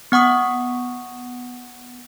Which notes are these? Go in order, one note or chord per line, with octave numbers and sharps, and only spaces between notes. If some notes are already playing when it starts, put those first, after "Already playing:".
B3 F#5 C#6 D#6